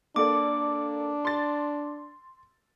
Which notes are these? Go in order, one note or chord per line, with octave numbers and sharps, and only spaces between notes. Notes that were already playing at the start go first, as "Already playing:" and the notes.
A#3 D4 A4 D5 D6
C6 A6